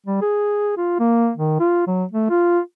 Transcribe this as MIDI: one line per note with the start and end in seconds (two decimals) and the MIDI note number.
0.06 0.19 55
0.21 0.73 68
0.77 0.95 65
0.99 1.31 58
1.37 1.57 51
1.59 1.87 65
1.87 2.04 54
2.11 2.28 57
2.30 2.59 65